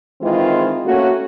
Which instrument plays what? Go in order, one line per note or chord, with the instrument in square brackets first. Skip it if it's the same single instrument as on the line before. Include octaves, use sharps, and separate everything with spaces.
[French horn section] D#3 E3 G#3 C4 F4
A3 A#3 C#4 F#4